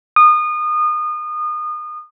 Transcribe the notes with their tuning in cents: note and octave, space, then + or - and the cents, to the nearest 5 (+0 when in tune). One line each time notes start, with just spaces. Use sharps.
D#6 -30